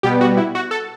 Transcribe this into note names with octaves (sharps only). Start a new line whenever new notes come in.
B2 G3 B3 G4
F#4
E4
F#4
A4